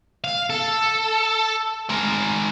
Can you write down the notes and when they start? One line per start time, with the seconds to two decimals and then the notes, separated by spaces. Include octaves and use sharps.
0.24 F5
0.50 A4
1.90 G#3 A#4